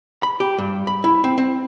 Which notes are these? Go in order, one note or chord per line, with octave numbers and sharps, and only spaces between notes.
B5
G4
G2
B5
E4
C4
C4